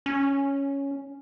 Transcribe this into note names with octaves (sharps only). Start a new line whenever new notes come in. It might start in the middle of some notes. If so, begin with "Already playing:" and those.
C#4